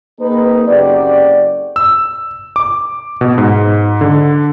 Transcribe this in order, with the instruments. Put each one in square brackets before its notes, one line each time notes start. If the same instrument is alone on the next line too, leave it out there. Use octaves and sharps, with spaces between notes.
[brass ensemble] A#3 C4 D#4 G#4 A#4 B4
F#1 C4 F#4 G4 D5
[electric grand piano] E6
D6
B2
G#2
D3